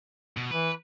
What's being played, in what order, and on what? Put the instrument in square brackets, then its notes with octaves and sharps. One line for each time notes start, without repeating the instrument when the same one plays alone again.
[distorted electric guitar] B2
[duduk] E3 [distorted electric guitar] B4